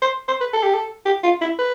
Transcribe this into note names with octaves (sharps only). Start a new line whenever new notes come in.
C5
C5
B4
A4
G4
A4
G4
F4
E4
B4